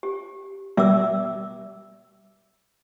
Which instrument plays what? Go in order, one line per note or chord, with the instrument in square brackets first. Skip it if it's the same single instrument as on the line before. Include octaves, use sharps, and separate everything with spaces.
[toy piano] G4
[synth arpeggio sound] B2 G3 [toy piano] E5 D6 E6